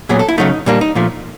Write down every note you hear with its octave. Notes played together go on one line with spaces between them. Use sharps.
A#2 F#3 B3 G#4
A4
E4
C#3 F#3 A3 D#4
A#2 G3 A#3 D4
D#4
A#2 F3 A3